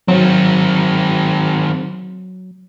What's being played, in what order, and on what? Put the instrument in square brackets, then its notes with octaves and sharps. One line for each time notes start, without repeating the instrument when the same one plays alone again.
[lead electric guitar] D#3 C4 [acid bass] F#3